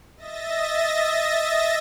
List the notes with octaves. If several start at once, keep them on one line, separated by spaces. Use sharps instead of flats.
D#5 E5 A6 A#6